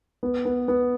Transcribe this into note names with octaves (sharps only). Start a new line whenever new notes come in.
B3
B3
B3